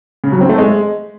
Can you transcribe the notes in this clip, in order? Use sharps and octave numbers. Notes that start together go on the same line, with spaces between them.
C#3
F#3
C4
A3
G#3